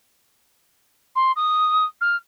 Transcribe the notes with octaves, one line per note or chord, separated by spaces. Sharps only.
C6
D#6
F6